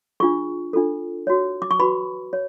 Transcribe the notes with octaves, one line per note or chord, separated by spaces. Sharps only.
D4 F4 G#4 C#6
D4 F4 A4
F#4 C#5
D6
C#6
F#4 B4 B5
C#5